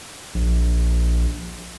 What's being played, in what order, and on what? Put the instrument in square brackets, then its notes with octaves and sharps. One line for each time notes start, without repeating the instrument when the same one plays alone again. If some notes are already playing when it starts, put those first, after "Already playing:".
[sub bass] A#1